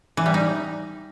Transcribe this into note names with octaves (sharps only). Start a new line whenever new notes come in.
E3
G3
D#4